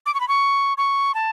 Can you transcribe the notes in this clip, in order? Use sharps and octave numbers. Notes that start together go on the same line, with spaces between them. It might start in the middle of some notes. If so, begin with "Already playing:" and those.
D6
C#6
B5
C#6
C#6
A5